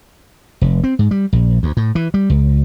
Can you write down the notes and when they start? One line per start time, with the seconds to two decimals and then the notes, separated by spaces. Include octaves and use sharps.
0.61 F1
0.84 C4
0.99 G#2
1.11 G3
1.33 A#1
1.63 D2
1.77 A2
1.95 E3
2.14 G3
2.30 C#2